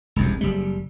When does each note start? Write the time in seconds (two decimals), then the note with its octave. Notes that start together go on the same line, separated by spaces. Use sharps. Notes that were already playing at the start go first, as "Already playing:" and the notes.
0.16 E1 C2 F2
0.41 F#1 G3